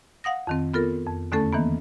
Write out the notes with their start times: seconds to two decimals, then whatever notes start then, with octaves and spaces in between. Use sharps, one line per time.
0.24 F5 F#5 D#6 A#6
0.47 F2 D#3 C4
0.74 B3 F4 A4 A#4
1.07 F2
1.32 E2 D3 A3 C#4 A4 A5
1.53 D#3 E3 A#3 B3